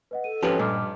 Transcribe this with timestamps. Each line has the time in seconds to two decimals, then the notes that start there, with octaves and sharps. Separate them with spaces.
0.11 B4 D#5 F#5
0.24 A4 D#7
0.43 G#1 F3 C#4 G4 B4 G5 G#5
0.59 G2 A#2 D#5 D6 F6